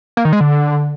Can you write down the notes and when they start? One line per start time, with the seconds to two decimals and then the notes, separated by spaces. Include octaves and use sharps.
0.17 A#3
0.25 D#3
0.33 G#3
0.40 D3